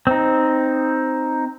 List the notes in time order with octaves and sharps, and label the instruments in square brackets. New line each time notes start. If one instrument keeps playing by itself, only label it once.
[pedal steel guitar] C4 D#4